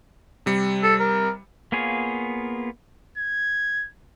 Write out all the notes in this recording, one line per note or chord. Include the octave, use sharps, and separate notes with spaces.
C3 G3 C#7
A4
A#4
A#3 B3 F4 G#4 C#5
G#6